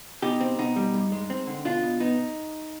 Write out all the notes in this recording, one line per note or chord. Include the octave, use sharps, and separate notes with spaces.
B2 D#4 G4
C4
B2 D#4
G3
G2
G#3
C4
D3
B2 D4 F4
B2
B3 D#4